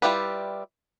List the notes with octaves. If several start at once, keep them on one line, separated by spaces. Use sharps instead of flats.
G3 E4 F4 G4 B4